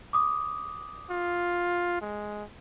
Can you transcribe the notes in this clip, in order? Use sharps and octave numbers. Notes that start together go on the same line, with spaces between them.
D6 D#6
F4
G#3